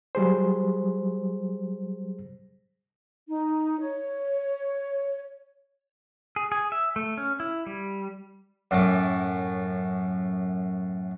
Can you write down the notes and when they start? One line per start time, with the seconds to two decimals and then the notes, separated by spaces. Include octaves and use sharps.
0.15 F#3 G3 G#4 C5
3.28 D#4
3.80 C#5
6.36 G#4
6.52 G#4
6.72 E5
6.96 A3
7.17 C#4
7.40 E4
7.66 G3
8.71 F#2 A2 D6